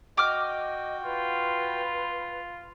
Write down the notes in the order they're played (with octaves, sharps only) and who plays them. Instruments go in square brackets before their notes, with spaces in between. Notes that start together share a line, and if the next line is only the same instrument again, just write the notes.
[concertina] F#4 G5 [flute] D#5 [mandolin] D6 F6
[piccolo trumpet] F4 [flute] B4